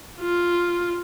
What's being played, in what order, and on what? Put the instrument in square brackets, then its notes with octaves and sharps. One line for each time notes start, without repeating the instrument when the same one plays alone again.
[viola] F4